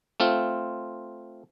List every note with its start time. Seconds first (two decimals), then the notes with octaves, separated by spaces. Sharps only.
0.20 A3 C4 F4